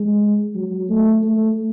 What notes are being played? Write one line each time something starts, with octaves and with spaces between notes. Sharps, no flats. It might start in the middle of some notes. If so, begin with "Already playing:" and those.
Already playing: G#3
F#3
A3
A3